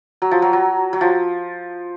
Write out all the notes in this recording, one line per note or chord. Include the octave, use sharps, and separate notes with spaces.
F#3
F3
F#3
F#3
F#3
F3